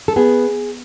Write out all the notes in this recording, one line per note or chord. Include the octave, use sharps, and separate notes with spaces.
A4
B3 G#4